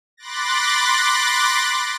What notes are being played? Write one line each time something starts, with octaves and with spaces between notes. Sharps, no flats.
B5 C6 D6 F#6 A6 A#6